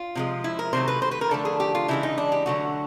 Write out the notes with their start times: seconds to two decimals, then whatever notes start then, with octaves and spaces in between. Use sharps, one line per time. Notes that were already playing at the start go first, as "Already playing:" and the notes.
Already playing: F4
0.15 C3 F3 G#3
0.44 E4
0.59 A#4
0.73 C3 D#3 F#3 A3 C5
0.88 B4
1.02 C5
1.11 B4
1.21 A#4
1.31 D3 F3 A3 A4
1.45 G#4
1.60 G4
1.75 F4
1.88 C#3 E3 G#3 E4
2.03 D#4
2.18 D4
2.32 G4
2.46 D3 F#3 A3 F#4